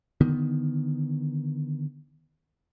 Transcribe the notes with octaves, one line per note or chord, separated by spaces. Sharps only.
D3 D#3 B3